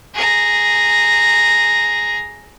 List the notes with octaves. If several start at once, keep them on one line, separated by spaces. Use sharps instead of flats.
G#4 A#5